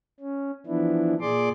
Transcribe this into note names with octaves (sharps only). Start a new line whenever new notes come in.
C#4
E3 F3 B3 D4 E4
A#2 G#4 D5 C6 D6